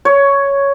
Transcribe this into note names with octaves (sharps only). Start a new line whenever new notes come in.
C#5